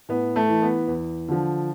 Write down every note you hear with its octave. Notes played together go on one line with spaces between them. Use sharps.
A2 B3
A3
E3
B3
E2
D3 F3